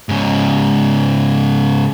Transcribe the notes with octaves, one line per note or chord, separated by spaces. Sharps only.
G#2 C#3